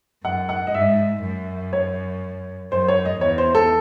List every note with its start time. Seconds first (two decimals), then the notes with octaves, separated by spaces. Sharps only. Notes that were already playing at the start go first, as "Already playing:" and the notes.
0.25 F#2 F#5
0.49 F#5
0.67 D#5
0.73 G#2 E5
1.24 F#2
1.73 C#5
2.72 F#2 C5
2.88 C#5
3.05 D#5
3.21 E2 C#5
3.38 C5
3.55 A4